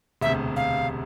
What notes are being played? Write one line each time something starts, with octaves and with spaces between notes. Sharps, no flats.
E1 D2 C3 E5
F5